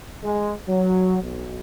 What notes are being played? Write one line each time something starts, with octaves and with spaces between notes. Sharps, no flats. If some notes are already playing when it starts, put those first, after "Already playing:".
G#3
F#3
B1